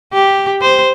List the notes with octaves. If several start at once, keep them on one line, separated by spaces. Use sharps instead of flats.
G4
C5